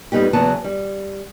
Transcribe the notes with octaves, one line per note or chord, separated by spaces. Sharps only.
F2 G3 B3 D#4 G4
E2 C#3 F#3 B3 A5
G3